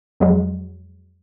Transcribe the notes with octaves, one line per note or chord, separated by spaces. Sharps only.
F2 F#3 G#3